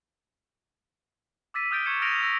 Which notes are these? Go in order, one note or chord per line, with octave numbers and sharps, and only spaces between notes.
D6 E6 A6 B6 D#7
D#6 F6 G6 A6 D7 G7
C#6 G#6 C#7 E7
F6 A#6 D7 D#7 F7
D#6 E6 A#6 D#7